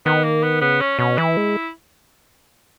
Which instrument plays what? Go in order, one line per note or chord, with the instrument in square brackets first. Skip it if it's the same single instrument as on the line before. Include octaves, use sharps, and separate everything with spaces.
[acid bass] D#3 [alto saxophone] B3
[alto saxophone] A#3
B3
[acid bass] C#3 [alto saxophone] B3
[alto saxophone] C#4
[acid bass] B2 [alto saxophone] C#4
[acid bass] E3 [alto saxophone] E4
[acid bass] G#3